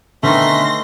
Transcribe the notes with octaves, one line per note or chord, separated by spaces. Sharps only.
D3 D#3 A3 B3 C#4 E5 C6 A#6